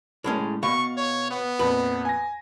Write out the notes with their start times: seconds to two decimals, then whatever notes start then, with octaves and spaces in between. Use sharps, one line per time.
0.24 A2 G#3 C#4
0.63 B2 F5 C#6
0.97 C#5
1.31 B3
1.59 F2 A#2 B4
2.05 G#5 A#6